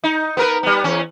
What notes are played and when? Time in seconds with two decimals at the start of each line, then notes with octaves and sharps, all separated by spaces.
0.04 D#4
0.37 B3 A#4 B4
0.63 G3 B3
0.84 E2 C#4